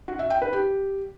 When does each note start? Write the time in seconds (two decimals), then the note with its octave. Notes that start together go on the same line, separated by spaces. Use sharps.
0.08 F#4
0.19 E5
0.30 G5
0.42 B4
0.53 G4